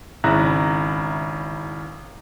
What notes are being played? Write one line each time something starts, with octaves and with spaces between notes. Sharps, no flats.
G#1 C#3 E4 A#5 F#6 A#6